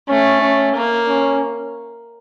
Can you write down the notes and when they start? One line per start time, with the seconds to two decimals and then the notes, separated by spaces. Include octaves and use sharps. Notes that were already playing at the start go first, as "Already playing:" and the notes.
0.09 A3 C#4
0.41 C#4
0.75 A#3
1.08 C#4